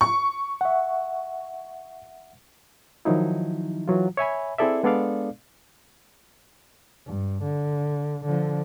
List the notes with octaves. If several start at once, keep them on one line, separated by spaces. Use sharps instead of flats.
C#6
E5 F#5
D#3 F3 F#3 D#4 E4
E3 F#3 F4
C#5 E5 G#5 B5
C4 E4 G#4 A4 D5 E5
G#3 B3 D4 A4 D5 F5
G2
D3
D3 F3